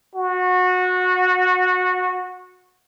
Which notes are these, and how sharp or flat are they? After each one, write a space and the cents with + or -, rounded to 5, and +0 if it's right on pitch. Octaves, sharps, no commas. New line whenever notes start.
F#4 -20